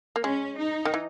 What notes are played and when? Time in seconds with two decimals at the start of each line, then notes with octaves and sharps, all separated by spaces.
0.16 A#3
0.24 G#3 C#4
0.58 D#4
0.85 D#3
0.94 E3